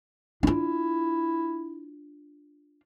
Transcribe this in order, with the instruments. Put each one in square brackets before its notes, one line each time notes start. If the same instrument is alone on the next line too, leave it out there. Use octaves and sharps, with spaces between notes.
[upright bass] D4 F4 [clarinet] E4